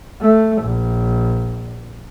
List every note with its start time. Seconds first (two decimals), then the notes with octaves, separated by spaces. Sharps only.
0.22 A3
0.62 A#1